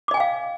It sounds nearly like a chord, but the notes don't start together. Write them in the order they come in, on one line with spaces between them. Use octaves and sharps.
D6 D#5 G#5 G5 F5